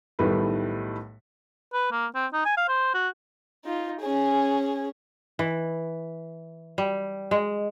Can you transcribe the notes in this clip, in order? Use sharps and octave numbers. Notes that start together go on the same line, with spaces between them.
B1 A2 D#3 G3 A3 B4
B4
A#3
C4
D#4
G#5
F5
C5
F#4
D#4 F4
C#4 G#4
E3
G3
G#3